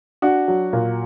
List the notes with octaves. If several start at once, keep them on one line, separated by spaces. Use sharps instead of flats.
D4 F#4
F#3
A#2